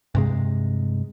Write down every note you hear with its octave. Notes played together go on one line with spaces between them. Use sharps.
G2 C3 G#3